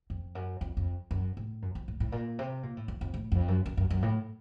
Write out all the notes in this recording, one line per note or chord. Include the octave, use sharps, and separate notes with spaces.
F2
F#2
F2
F2
F#2
A2
F#2
F2
A2
A2
A#2
C3
A#2
A2
F2
F2
A2
F2
F#2
F#2
F#2
F#2
A2